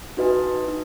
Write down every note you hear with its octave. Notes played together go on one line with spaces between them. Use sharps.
D#4 F#4 B4 D#5 G#5
D#4